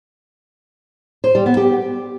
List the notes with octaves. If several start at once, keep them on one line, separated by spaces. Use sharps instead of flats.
C5
G3
B3
G4